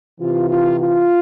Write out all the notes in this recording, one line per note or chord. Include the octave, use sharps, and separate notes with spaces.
C3 E3 F4
F4
F4